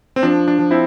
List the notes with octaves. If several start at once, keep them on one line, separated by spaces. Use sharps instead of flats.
C4
F3 D4
D4
F3
C4 E4